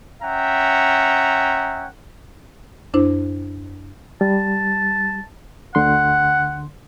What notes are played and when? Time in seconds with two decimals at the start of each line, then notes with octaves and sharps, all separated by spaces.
0.22 C#4 E5 F#5 G5 A#5
2.94 F#2 D4 E4 C5
4.21 G3 A5
5.75 D2 D3 F#5 C6